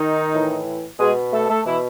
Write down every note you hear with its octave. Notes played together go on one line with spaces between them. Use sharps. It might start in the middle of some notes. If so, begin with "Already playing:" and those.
Already playing: D#3 D#4
A2 E3
B2 G#3 G#4
A3 A4
A3 A4
B2 E3 E4